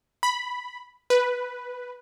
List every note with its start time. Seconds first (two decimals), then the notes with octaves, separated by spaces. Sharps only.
0.23 B5
1.10 B4